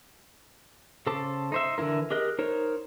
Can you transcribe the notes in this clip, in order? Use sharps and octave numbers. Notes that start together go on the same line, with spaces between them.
C#3 A4 C5 A5 D6
D#4 C5 E5
D3 E3 E4 A#4
G4 G#4 A#4 D#5 F#6
D#4 A#4 C5 C#5